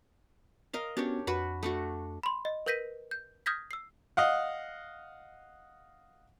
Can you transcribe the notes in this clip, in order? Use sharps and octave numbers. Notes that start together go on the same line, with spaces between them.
A#4 D#5 F5
B3 C#4 D4 F#4 G4 C#5
F2 F#4 B4 B5
A3 D4 F#4
B5 C6
D#5
A#4 B4 G6 A#6 B6 D#7
G6
D#6 F6 G6 G#6 A#6 B6
E6 C7
D#5 F5 F#5